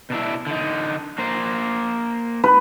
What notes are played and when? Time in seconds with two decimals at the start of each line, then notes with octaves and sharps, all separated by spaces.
0.10 B2 D4 E4
0.47 D3 D#4
1.18 A#3 C5
2.44 B4